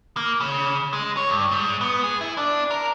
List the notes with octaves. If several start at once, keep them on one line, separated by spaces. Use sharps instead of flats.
A#3
C#3
G#3
C#5
G2
G#2
B3
G#4
E4
D4
A#4